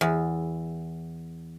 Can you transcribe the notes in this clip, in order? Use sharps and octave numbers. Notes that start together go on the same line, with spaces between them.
E2